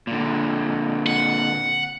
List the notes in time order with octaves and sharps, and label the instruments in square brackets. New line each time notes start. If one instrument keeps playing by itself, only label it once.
[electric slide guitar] A#2 D3
[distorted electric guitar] F#5